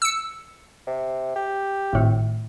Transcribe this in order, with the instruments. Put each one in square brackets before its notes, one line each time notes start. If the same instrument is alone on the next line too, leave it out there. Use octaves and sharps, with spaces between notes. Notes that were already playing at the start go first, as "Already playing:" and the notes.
[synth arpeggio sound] E6 C#7
[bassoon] C3
G4
[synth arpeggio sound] G#1 A2